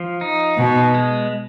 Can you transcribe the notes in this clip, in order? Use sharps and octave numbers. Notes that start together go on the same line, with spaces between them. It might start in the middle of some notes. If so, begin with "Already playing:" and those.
Already playing: F3
D#4
B2 B3
G#3